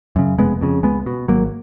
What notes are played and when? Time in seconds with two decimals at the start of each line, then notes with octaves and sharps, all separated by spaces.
0.16 F#2 C#3
0.38 F1 G#3 B3
0.61 F2 C#3
0.83 C#2 G#3 B3
1.06 B2
1.28 G#1 F#3 A#3